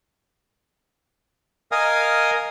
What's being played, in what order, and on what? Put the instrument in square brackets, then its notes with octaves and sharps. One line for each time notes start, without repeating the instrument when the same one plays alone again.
[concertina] A#4 D#5 F5 G#5 D#6